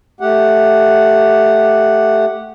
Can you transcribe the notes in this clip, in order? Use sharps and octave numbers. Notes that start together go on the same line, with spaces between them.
A3 G4 F#5